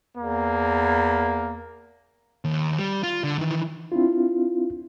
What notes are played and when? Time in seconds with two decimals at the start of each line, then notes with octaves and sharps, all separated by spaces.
0.17 E2 A#3
2.45 D#2
2.78 G3
3.03 F4
3.24 D3
3.39 D#3 E3
3.92 C4 D4 E4 F4